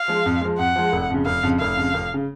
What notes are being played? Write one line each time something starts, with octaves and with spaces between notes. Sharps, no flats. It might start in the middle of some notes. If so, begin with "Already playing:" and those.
Already playing: F5
F3 G#3
F2
F3 G#3
F2 F#5
F3 G#3
F1
F2 C#3
F1 F5
F2 C#3
F1 F5
F2 C#3
F1
C#3